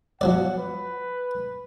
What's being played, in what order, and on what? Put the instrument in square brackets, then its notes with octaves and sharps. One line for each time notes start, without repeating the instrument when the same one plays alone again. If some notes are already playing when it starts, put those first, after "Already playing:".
[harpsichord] F3 F#3 D5 [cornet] F#5
[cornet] B4